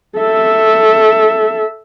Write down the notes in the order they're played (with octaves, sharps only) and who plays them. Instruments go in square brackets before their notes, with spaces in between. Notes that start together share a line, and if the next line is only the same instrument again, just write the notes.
[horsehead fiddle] A4 E5